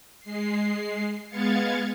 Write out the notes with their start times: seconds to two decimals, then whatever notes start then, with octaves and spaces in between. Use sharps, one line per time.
0.20 G#3 C7
1.29 G#3 B3 F5 G#6 A6 C#7